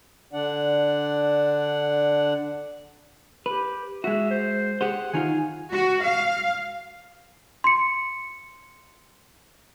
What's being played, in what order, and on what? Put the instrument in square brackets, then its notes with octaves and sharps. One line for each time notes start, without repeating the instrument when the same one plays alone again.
[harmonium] D3 D4 D5 F#5
[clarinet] G4 [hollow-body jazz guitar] B4
[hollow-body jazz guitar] G#3 F#4 [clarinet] E5
[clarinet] C5
[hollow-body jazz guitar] G4 G#4 C5 [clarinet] F#5
[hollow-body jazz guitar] D#3 D#4 F4 [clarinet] G#5
[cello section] F#4
F5
[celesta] C6 C#7